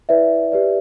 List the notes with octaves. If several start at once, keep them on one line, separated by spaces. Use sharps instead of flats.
E4 B4 D5 E5
G4 B4 D5